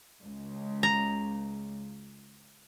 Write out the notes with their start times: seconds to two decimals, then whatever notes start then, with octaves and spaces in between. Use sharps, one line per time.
0.25 C#2
0.83 A#5